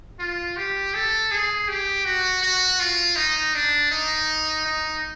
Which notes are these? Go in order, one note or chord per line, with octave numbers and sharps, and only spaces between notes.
F4
G4
A4
G#4
G4
F#4
F#4
F4
D#4
D4
D#4
D#4